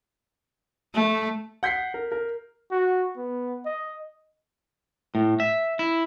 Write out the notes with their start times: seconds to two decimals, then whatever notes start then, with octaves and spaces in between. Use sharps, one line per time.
0.94 A3
1.63 F#5 G6 B6 C7
1.94 A#4
2.12 A#4
2.71 F#4
3.17 B3
3.65 D#5
5.15 A2
5.40 E5
5.79 E4